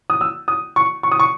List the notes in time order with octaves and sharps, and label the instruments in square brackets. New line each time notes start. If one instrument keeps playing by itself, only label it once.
[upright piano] D#6
E6
D#6
C#6
C#6
D#6
C#6